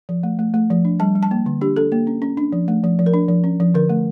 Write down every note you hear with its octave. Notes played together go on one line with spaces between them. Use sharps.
F3
A3
A3
A3
F3
D4
G3 A5
G3
A5
A#3
D3
D4 G4
D4 A4
A#3
C#4
C#4
D4
F3
A3
F3
F3
A#4
D4
F3
C#4
F3
D3 A#4
A3